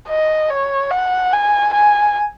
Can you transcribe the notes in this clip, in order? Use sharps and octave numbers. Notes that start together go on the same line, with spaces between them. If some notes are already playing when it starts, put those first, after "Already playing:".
D#5
C#5
F#5
G#5
G#5